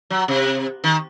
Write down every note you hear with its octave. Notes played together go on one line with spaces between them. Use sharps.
F#3
C3
D#3